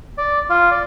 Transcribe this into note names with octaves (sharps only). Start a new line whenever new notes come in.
D5
F4
D5